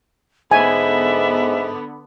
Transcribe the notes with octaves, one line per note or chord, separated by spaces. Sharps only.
G#2 D3 B3 E5 G#5